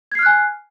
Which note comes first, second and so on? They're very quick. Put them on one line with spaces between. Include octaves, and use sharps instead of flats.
G#6 C7 F6 F#6 G#5